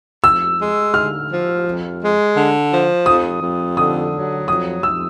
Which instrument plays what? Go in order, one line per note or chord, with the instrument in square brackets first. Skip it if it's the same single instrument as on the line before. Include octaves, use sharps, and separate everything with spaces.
[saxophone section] F2 [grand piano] E6
[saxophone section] G#3
[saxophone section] D3 [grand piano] F6
[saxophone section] F3
F2
G#3
D3
F3
[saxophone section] F2 [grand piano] D#6
[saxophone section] F2
[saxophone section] D3 [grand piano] D#6
[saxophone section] F#3
[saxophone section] F2 [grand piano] D#6
[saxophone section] F2 [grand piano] E6